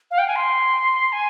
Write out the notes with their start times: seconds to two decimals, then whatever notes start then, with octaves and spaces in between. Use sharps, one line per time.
0.11 F5
0.18 G5
0.28 G#5
0.36 C6
1.12 G#5